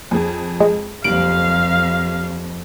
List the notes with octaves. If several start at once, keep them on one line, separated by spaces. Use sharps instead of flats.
F2 G#4
G#3
F#1 F2 G3 F5 D7 F#7